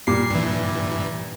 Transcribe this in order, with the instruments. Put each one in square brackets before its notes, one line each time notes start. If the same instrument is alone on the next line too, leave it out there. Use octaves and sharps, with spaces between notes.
[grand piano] A#2 G3 [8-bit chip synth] C7
[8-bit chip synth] G2 E3